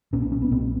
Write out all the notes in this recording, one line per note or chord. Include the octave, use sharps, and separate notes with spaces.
B1 A#2 C#4
D4
C#4
B3
B1 A#2 C4